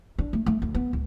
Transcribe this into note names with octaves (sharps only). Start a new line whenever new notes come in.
D4
A3
A3
D2
B3
C#2